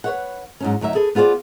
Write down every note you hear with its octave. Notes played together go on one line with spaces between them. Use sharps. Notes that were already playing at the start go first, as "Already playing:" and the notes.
B4 C#5 F#5
G#2 F#3 C#4
D2 F#3 D#4 E5
G#4 A4 B4
B3 F4 G#4 C5 D5